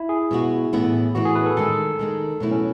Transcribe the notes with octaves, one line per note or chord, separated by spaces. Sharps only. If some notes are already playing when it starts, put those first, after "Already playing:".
Already playing: E4
G#4
B2 G#3 B3 F#4
A2 E3 B3 E4
A2 E3 B3 E4 F#4
G#4
B4
A4
D#3 G#3 D#4 A4
D#3 G#3 D#4
B2 F#3 A3 E4
C#4